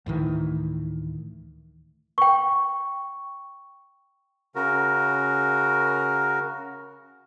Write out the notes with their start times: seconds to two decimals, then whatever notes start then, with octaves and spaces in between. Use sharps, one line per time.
0.06 D2 A2 D#3 E3
2.18 G5 C#6
4.55 C#3 F#4 A#4